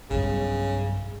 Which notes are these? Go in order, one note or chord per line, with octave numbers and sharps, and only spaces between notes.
B1 G2 C#3